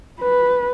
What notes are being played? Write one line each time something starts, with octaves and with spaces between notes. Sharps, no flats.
B4